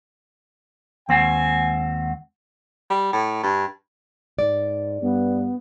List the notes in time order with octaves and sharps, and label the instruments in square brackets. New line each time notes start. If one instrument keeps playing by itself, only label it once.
[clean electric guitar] D#2 C4 [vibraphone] G#3 F#5 [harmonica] G#5
[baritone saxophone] G3
A2
G2
[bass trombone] G#2 [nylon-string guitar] D5
[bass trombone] G2 [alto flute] B3